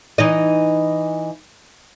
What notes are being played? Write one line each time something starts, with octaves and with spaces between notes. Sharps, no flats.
E3 D#4 D#5